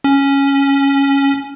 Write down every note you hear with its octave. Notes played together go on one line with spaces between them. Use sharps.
C#4